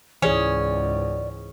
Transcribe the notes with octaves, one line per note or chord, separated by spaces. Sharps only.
C#2 G#2 E3 C#4 G#4 D5